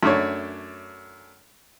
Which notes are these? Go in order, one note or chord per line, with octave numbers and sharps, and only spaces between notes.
F#2 A3 D4 C#5